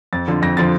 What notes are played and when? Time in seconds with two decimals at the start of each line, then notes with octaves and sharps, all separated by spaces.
0.13 F2 A6
0.28 D3 F3
0.42 F2 A#6
0.57 D3 F3 A6